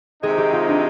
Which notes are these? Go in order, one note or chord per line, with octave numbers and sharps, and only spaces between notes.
C3 D#3 G#3 C4 D#4 G#4
G4
F4
D4